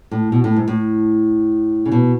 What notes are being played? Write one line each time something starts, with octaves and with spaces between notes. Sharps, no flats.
A2
B2
A2
G#2
A2
C#3
B2